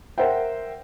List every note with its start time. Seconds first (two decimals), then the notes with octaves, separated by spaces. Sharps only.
0.18 A#4 C5 E5 F#5 G5